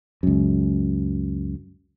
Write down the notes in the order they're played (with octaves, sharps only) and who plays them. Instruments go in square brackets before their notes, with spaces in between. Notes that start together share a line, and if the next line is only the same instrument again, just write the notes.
[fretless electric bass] C#2 F#2